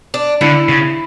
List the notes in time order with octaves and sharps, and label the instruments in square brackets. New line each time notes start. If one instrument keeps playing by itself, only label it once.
[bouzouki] D4
[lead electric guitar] D3 [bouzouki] E4
[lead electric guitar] C#3